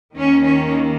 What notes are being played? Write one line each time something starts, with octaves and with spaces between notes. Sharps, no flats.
D#2 D#3 A#3 C#4
C#4